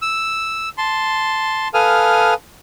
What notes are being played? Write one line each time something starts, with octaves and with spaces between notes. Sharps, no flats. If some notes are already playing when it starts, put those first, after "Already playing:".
E6
A5 C6
A4 B4 F5 G#5 D#6 F6